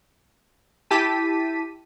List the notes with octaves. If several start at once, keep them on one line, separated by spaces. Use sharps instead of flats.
E4 G4 A5 B6 D#7